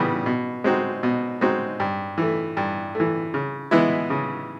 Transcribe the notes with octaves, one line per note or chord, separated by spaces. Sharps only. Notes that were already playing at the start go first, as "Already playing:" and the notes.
Already playing: C#3 E3 G3 B3
B2
G#3 C4 D#4 F#4
B2
G#3 C4 D#4 F#4
G2
E3 A3
G2
E3 A3
C#3
E3 G#3 B3 E4
C#3